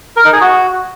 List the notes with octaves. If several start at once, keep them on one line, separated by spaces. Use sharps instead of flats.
A#4
D#4
G#4
F#4